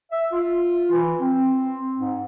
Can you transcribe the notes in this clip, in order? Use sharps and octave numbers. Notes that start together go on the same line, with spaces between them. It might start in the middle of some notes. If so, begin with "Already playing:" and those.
E5
F4
E3
C4
G#2